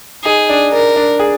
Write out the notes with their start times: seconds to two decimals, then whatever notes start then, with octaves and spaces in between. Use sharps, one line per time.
0.25 D#4 G#4
0.49 D4
0.73 D4 A#4
0.96 D4
1.19 G#4